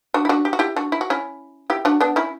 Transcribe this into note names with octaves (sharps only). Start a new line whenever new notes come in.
D4 F#4
E4
D4 F#4
G4
F#4
E4 G4
D4 F#4
E4
F#4
C#4 E4
E4 G4
D4 F#4
B3 D4
C#4 E4